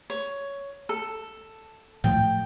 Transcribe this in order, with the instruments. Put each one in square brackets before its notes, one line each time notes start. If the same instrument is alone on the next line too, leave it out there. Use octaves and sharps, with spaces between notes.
[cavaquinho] C#5
A4
[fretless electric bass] A2 F3 A3 [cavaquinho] G5